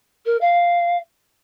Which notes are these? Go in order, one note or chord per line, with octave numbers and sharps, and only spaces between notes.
A#4
F5